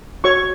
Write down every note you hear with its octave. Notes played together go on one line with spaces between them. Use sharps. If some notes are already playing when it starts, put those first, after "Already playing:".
F#4 C#5 C#6